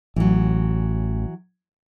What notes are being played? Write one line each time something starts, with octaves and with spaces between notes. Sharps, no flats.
A1 E3 F#3